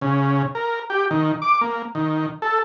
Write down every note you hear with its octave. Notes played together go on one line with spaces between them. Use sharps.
C#3
A#4
G4
D#3
D6
A#3
D#3
A4